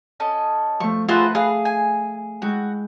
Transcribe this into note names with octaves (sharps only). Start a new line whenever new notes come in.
C#4 A4 D#5
F3 A3 C#6
A3 F4 F#4 G#4 B4 C5 E5 A5
G#4 F5
G#5
G#3 E4 F#4 G5